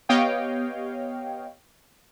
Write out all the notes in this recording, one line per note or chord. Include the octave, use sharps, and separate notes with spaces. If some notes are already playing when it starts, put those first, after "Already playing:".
B3 G4 C#5 D#5 F5 G5